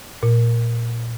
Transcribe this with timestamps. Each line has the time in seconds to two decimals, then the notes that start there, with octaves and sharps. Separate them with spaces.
0.23 A#2